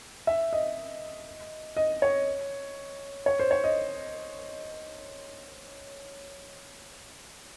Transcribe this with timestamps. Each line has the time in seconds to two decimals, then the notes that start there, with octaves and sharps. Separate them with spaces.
0.27 E5
0.53 D#5
1.77 D#5
2.02 C#5
3.26 C#5
3.40 C5
3.51 C#5
3.64 D#5